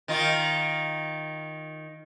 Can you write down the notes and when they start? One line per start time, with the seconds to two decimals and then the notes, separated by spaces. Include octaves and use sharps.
0.08 D#3 D#4 F4